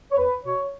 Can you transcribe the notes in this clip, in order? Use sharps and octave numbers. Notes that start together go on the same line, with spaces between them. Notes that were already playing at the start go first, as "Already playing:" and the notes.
C#5
E2 B4
B2 C#5